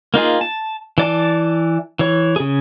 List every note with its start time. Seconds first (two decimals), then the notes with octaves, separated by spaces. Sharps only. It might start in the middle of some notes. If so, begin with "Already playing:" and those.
0.14 A#3 D#4 F4 G#4
0.41 A5
0.98 E3 D5 A5
1.99 E3 C#5
2.36 C#3 G#4